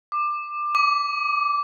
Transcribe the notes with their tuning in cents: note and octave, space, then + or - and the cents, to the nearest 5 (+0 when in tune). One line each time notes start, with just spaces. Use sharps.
D6 +20
D6 -15